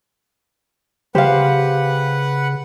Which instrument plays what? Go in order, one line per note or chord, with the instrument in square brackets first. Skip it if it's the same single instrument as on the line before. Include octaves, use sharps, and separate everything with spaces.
[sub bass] C#3 [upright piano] G4 [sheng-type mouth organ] B4 F#5 [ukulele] C5 F5